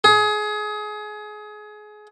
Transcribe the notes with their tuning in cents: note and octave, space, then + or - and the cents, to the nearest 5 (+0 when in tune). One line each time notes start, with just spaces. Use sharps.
G#4 +25